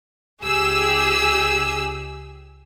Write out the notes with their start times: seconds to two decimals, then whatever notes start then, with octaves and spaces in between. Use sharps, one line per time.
0.42 C#2 G4 G#4 E6